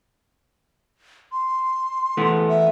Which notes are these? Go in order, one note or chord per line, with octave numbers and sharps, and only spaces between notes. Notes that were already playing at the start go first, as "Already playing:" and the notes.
C6
E3 A3 B3
E5